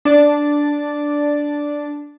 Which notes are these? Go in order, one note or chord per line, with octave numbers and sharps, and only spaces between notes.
D4 D5 A6